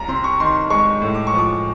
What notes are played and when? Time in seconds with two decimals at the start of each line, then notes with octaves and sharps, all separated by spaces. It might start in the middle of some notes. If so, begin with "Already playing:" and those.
Already playing: C2 A#5
0.08 C3 C6
0.24 C#6
0.40 D#3 C6
0.70 G#3 C#6
1.02 A2
1.15 D6
1.27 C#6
1.33 F3 D6